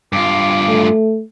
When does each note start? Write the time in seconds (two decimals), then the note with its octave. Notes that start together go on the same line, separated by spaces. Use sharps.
0.13 G2 F4 D6
0.68 A3